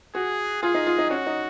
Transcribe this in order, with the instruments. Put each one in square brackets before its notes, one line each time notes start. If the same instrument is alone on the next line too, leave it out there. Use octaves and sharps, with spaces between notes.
[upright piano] F#4 [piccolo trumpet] G#4
[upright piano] F4 [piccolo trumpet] G#4
[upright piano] D#4
F4
D#4
[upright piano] C#4 [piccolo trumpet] F#4
[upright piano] D#4